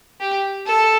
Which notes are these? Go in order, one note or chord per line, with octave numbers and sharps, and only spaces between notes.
G4
A4